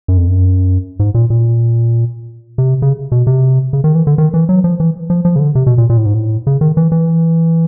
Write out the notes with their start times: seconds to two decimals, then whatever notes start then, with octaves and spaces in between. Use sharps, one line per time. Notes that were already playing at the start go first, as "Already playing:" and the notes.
0.08 F#2
0.18 F2
0.27 F#2
0.99 G#2
1.14 A#2
1.30 A#2
2.58 C3
2.82 C#3
3.12 B2
3.27 C3
3.73 C#3
3.84 D#3
3.95 E3
4.07 D3
4.18 D#3
4.34 E3
4.49 F#3
4.64 F3
4.80 E3
5.10 F3
5.25 F3
5.36 C#3
5.39 D3
5.55 C3
5.67 B2
5.78 A#2
5.90 A#2
5.98 A2
6.05 G#2
6.14 A2
6.47 C#3
6.61 D#3
6.77 E3
6.92 E3